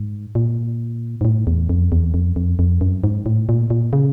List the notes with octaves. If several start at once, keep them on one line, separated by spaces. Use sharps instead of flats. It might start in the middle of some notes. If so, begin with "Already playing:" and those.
Already playing: G#2
A#2
G#2
A2
E2
F2
E2
F2
F2
F2
F#2
G#2
A2
A#2
A#2
C#3